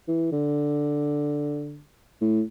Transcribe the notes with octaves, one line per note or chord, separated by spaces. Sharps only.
E3
D3
A2